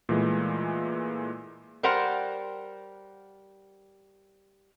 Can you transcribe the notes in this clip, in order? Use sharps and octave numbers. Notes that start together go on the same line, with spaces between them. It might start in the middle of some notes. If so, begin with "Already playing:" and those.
A#2 E3 G#3 A3
G3 A#4 C5 F#5